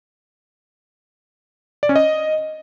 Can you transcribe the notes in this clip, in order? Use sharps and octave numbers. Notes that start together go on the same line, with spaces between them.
D5
C#4
D#5